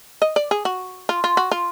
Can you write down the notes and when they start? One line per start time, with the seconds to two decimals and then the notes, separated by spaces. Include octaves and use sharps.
0.22 D#5
0.36 D5
0.51 G#4
0.65 F#4
1.09 F4
1.24 F4
1.37 F#4
1.51 F4